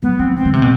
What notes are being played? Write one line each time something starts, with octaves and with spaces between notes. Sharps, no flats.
F#3 B3
F3 C4
E3 C4
D3
C3 C4
B2